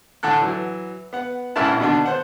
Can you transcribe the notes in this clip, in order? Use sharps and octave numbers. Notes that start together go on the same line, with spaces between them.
A2 D3 D4 A4 F#6
E3 F#3
B3 F#5
A#1 G#2 C#3 A#3 E4 A5
B2 D3 D#3 D4
B3 C5 F#5